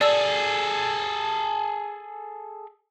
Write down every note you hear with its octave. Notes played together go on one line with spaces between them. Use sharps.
G#4 A4 D5 E6